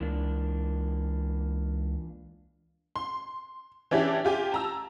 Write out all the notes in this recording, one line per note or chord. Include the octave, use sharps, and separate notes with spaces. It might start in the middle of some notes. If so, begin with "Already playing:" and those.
C#2 E3 A#3 D4
C6
E3 C#4 D4 E4 G4
F4 G4 G#5
A5 A#5 E6